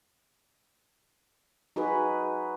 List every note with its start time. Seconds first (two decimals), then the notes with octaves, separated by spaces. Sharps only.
1.76 D#4 F#4 G#4 B4